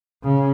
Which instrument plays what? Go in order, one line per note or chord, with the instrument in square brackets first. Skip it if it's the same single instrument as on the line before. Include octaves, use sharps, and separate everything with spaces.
[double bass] C#3